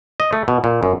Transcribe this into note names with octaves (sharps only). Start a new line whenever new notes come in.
D#5
A3
B2
A#2
F#2